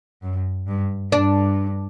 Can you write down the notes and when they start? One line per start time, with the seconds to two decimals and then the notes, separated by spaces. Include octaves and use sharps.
0.22 F#2
0.67 G2
1.12 G2 D4